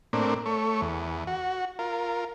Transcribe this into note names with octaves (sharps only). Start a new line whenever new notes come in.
A2 A#3 C4 D4
A3 C#5
E2
F#4
F4 A#4